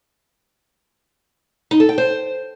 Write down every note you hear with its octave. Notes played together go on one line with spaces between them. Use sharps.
D#4
A4
G5
C5